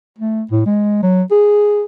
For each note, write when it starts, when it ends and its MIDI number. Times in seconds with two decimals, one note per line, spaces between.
0.18 0.43 57
0.51 0.62 45
0.66 1.00 56
1.03 1.22 54
1.31 1.84 68